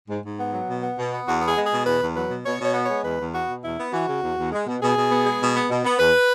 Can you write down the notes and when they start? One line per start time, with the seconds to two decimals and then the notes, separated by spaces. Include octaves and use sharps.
0.08 G#2
0.22 G#2
0.37 B3
0.52 F#3
0.67 B2
0.82 B3
0.97 B2
1.11 B3
1.26 E2 F#4
1.40 B3
1.46 G#4
1.55 G#3
1.65 G#4
1.70 B2
1.85 E2 B4
2.00 E2
2.14 F#3 B4
2.30 B2
2.44 B2 C#5
2.59 B2
2.64 C#5
2.74 B3
2.84 G#3 C#5
3.03 E2 B4
3.18 E2
3.33 B3 F#4
3.47 B2
3.62 E2 E4
3.77 B3
3.92 E3 F#4
4.06 C#3
4.21 E2
4.36 E2
4.51 G#3
4.65 B2
4.80 B2 G#4
4.95 B2
5.10 B3
5.25 G#3
5.39 B2
5.54 B3
5.69 B2
5.84 B3
5.98 E2 B4